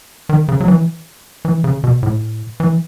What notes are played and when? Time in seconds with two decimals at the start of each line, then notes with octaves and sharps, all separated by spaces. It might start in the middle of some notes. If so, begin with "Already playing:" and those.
0.29 D#3
0.48 C#3
0.60 F#3
0.68 E3
1.45 E3
1.64 C#3
1.84 B2
2.03 A2
2.60 E3